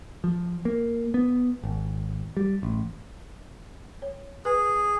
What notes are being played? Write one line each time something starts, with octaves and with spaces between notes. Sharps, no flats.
F3
A#3
B3
G#1
G3
A1
C#5
G#4 B4